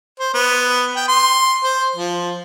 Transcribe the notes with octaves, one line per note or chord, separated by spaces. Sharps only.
C5
B3
G5
C6
C5
F3